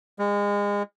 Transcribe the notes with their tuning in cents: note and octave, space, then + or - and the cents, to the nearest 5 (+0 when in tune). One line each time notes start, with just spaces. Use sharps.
G#3 -30